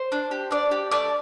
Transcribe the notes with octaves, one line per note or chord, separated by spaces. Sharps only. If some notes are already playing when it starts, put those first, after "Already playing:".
Already playing: C5
D4
G4
D4 D5
G4
A3 D5